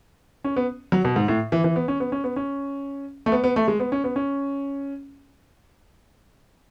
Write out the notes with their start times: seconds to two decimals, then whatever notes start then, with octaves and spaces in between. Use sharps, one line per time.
0.44 C#4
0.56 B3
0.92 F#3
1.05 B2
1.16 G#2
1.28 A2
1.52 E3
1.64 E3
1.76 B3
1.88 C#4
2.00 B3
2.12 C#4
2.24 B3
2.36 C#4
3.26 A3
3.32 B3
3.44 B3
3.56 A3
3.68 G#3
3.80 B3
3.92 C#4
4.04 B3
4.16 C#4